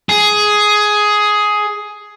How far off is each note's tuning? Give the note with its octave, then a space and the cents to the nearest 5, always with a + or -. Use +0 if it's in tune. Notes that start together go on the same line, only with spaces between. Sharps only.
G#4 +10